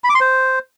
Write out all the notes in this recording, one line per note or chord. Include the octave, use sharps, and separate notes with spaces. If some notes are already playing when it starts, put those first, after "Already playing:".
B5
D6
C6
C5